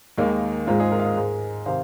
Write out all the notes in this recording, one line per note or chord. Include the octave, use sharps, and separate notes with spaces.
D#2 D#3 G#3 A#3 D#4
G#2 G#3 C4 F4
D#4 G#4
F4 A#4
F5
A#4 D#5
G#2 G#3
C3 D#3 C5 F5